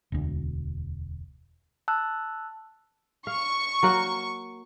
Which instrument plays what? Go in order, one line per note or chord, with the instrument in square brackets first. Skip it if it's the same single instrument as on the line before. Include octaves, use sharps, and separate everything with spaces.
[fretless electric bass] E1 D2
[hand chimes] A5 E6 F#6
[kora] F5 [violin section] C#6
[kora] F#3 A#3 F#4